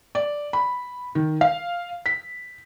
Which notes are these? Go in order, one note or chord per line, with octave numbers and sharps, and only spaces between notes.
D5
B5
D#3
F5
B6